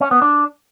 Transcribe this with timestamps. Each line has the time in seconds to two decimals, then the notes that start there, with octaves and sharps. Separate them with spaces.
0.01 C#4
0.11 B3
0.22 D4